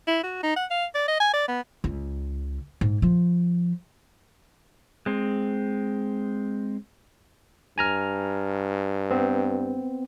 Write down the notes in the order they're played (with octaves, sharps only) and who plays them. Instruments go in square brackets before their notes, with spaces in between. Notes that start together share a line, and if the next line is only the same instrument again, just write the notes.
[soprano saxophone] E4
F#4
D#4
F#5
F5
D5
D#5
G#5
D5
B3
[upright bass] C#2
G#2
F3
[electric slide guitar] G#3 C4
[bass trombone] G2 [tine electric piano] G#5 A#5 F6
[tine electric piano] B3 C4